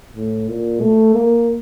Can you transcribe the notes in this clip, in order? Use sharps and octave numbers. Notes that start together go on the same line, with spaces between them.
A2
A#2
A3
A#3